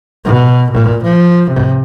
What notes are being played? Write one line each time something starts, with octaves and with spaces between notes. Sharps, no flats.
B2
A#2
F3
C3